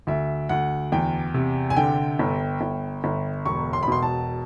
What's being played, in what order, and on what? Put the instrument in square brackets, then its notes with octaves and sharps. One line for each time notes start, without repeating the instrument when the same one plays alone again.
[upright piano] D2 E5
D2 F#5
E2 G5
C3
G#5
D3 G5
G1
G1
G1
E1 C#6
C6
B5
B2 C6
A5